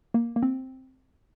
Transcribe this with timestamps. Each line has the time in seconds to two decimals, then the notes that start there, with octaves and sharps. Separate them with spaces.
0.14 A#3
0.36 A#3
0.43 C4